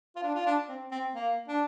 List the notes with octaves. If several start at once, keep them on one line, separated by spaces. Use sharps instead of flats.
F4
D4
F4
D4
C4
C4
A#3
D4